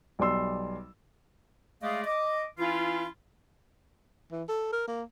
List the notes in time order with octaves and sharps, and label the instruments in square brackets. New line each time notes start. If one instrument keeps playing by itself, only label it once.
[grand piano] B1 G3 D5 C6 E6
[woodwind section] G#3 A3 G#4 D5 D#5 F5
D#5 D6
E3 C#4 E4 F4
[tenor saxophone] E3
A4
A#4
A#3